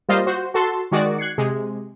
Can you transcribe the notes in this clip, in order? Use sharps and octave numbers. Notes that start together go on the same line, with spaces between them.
G3 A#3 F4 C5 D#5 F5
F#4 C5
F#4 A4 A5 C6
D#3 G#3 F#4 D5
F#6 G#6 C7 C#7
C3 G#3